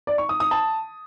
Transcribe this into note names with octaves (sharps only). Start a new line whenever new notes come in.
D5
C#6
D#6
D#6
A5